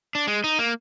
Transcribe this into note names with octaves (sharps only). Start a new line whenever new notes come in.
D4
G#3
D#4
A#3